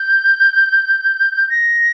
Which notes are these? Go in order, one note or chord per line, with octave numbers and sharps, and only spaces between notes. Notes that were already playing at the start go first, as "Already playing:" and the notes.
Already playing: G6
A#6